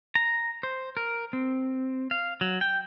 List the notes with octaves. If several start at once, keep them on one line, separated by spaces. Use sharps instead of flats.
A#5
C5
A#4
C4
F5
F#3
G5